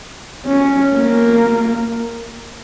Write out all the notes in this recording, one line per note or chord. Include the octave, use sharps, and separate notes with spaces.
C#4
A#3